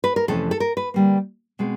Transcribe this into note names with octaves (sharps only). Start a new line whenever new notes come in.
B4
A#4
F2 C3 E3 A3 C#4 A4
A4
A#4
B4
D3 G3 A#3
B2 G#3 C4